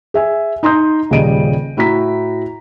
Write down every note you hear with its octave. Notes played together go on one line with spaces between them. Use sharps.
G#4 E5 G#5
D#4 A#5 C6 D#6 G6
D#1 C#3 G3 D#5 D7 D#7
A2 E4 F#4 A#5 B6